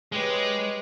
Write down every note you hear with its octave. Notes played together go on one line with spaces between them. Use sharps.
G#3 G4 B4 C#5